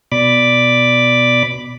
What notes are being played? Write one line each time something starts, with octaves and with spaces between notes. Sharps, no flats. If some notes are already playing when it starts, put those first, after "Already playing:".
B2 D5 B5 D6